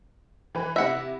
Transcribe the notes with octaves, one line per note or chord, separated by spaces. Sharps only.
E3 B4
C3 E4 E5 F#5 A#6